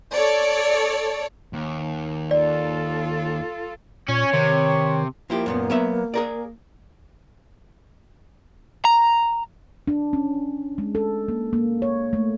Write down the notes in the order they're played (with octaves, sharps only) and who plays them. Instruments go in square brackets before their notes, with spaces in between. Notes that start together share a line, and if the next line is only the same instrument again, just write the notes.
[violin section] A4 C#5 D5
[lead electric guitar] D#2
[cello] F4 A4 [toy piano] D5
[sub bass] A#2 [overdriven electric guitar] C#4 [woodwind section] C#5
[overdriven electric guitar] C3 [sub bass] D#3
[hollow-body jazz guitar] F3 E4 G4 [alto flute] A#3
[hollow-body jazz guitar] F#2 A#2 B3
F#3 B3 E5
G#4 A#4 D5
[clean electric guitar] A#5
[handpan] D4
C#4
G#3
A4
A#3
A#3
C#5
A3